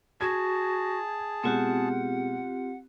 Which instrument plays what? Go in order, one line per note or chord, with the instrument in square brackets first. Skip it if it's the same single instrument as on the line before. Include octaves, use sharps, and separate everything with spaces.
[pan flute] F#4 [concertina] G#4 A5 [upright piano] G#6
[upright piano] B2 G#3 F#6 [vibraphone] C4 F4 G4 [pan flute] F#5